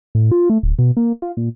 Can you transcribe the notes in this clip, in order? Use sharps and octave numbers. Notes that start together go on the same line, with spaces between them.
A2
F4
A3
D1
B2
A#3
F4
A#2